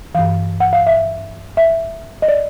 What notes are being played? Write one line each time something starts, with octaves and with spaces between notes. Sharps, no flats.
G2 E3 F5
F#5
F5
E5
E5
D#5
D5